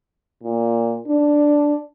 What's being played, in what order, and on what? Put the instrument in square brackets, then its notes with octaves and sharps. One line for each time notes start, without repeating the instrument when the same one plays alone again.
[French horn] A#2
D4